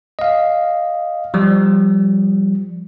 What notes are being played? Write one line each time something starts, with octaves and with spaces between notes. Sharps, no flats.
D#5 F5
F3 G3